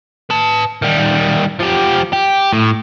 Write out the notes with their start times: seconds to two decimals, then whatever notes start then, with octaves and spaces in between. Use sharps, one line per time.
0.30 B4 A5
0.82 D#3 G3
1.59 F3 G4
2.13 G4
2.53 A2